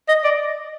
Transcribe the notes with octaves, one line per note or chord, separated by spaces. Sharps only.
D#5
D5